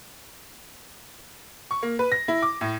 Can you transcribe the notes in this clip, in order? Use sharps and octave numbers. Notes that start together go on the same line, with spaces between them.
C#6
A#3
B4
A#6
E4
D6
A2